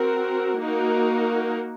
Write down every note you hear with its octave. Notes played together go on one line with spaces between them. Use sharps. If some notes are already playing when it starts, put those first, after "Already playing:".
Already playing: C4 F#4 A#4
A#3 D#4 F#4 A#4